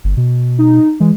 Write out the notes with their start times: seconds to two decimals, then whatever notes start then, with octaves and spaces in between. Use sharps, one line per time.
0.04 G1
0.17 B2
0.59 D#4
1.00 E3 G#3